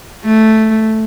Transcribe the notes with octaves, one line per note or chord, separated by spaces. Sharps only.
A3